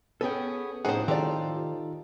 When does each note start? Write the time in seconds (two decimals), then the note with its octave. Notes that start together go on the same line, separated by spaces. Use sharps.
0.21 B3 C#4 G#4 A4 G5
0.85 A2 C3 F3 C#4 D#4 G#4 C5 F#5
1.08 D#3 D#4 F4 G4 A4 D5